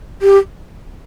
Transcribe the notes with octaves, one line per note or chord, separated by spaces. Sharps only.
G4